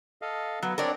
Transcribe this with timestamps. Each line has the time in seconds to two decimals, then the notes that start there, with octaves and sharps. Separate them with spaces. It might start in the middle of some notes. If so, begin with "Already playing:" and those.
0.22 A4 D#5 F5
0.63 F#3 B3
0.78 C4 D4 A#4 C#5 D5